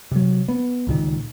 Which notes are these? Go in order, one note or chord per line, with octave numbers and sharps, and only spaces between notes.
C3 F#3
B3
C#2 A#2 D#3